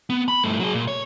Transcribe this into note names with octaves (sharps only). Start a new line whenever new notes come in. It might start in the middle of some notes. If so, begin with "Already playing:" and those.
B3
B5
G2 A3
F#3 G#4
A#2
C#5